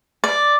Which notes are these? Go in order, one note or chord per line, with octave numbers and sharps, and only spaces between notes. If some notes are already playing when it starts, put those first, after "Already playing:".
D5